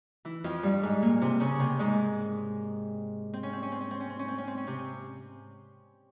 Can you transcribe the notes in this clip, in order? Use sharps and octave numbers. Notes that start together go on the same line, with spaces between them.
E3 E4
F2 F3
G2 G3
G#2 G#3
A#2 A#3
C3 C4
C#3 C#4
C3 C4
G#2 G#3
C4
C#4
C4
C#4
C4
C#4
C4
C#4
C4
C#4
C4
C#4
C4
C#4
C3 C4